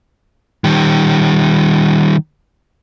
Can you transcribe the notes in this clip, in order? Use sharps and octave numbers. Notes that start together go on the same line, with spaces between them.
D#3 G3